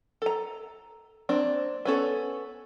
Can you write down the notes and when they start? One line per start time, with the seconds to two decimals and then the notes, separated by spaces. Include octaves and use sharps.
0.22 A4 A#5
1.29 A#3 C4 D4
1.85 B3 C#4 A4